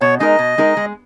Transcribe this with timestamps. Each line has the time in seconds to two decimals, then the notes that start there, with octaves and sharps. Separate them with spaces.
0.01 B2 C#5
0.20 G#3 D#4 A#4 D#5
0.39 B2
0.58 G#3 D#4 A#4
0.77 G#3